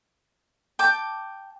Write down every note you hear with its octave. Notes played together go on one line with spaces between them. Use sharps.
G5 A5 D6